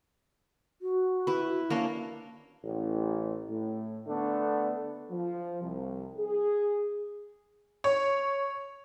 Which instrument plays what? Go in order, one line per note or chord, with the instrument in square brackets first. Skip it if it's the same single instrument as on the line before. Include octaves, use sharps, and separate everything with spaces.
[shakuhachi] F#4
[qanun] E4 B4
A#3 C#4 D4
[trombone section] A1
A2
D3 A3 B3 D4
[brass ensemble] F3
C2
G#4
[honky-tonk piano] C#5